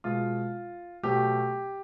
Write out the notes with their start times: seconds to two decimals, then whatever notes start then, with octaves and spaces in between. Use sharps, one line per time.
0.04 B2 G#3 F4
1.03 B2 F#3 A3 G4